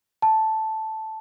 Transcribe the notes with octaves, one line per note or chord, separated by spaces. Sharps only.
A5